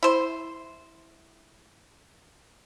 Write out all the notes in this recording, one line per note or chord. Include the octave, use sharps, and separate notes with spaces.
E4 C5